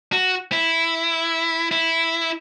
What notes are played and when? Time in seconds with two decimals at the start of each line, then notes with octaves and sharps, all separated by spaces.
0.13 F#4
0.52 E4
1.71 E4